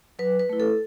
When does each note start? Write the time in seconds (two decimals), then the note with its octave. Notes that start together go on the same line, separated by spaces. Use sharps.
0.19 F#3 B4
0.40 B4
0.49 A3 E4
0.60 A4